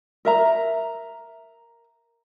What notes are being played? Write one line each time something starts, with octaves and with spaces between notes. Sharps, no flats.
A#4 E5 A#5